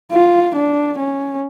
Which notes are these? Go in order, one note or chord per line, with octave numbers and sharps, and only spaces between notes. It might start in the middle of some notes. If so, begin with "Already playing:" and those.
F4
D4
C#4